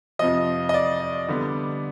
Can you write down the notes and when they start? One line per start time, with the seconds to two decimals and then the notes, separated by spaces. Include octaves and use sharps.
0.19 F2 C3 F3 D#5
0.69 D#5
0.74 D5
1.28 D3 G3 B3